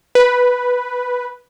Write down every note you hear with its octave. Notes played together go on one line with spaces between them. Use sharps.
B4